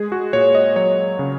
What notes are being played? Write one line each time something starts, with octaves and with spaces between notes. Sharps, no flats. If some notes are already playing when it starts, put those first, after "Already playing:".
Already playing: G#3 G#4
F#4
A#2 C#5
D#5
F#3 C#5
C#3